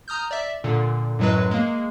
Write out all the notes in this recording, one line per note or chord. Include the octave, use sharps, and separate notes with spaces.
A#5 D#6 F6 G6
D5 E5
A#2 D3
F#2 A2 F#3 G#3 B4
G#3 A#3